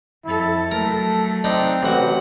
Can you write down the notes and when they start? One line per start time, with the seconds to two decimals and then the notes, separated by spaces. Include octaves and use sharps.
0.25 F2 E4 A4
0.71 F#3 A3 A4 A#4
1.44 C4 D4 D#4
1.83 A1 F#4